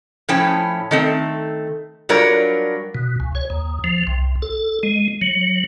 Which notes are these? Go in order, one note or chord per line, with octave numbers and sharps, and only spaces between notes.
A2 F3 C#4 E4 G5
D#3 A3 C4
F#3 G3 D4 F4 A#4 C#5
B2
C#2
C#5
D#2
F3
C2
A4
G#3
F#3